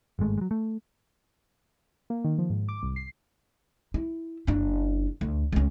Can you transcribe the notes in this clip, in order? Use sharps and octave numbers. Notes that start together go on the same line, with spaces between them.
G#1 G2 G#3 A3
F#3 G#3
A3
A#3
D#3
F3
G#2
D6
C2
C7
E4
F#1 D4
D2
C#2 C#4